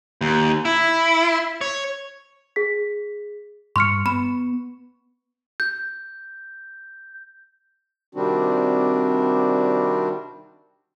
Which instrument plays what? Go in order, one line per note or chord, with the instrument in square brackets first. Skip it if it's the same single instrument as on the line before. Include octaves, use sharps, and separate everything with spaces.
[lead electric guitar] D#2
E4
C#5
[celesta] G#4 B6
[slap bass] G2 [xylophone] C6 F6 [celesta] C#6 C#7
[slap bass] B3 [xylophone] B5 E7
[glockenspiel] G6
[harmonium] C3 D#3 G3 C4 D4 F#4